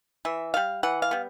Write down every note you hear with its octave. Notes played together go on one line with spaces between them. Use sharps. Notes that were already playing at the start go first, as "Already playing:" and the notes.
E3 E5
G3 B3 F5
E3 F#5
F5
G3 B3